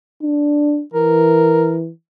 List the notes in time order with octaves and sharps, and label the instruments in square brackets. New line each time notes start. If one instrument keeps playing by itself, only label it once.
[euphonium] D4
[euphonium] E3 [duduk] A#4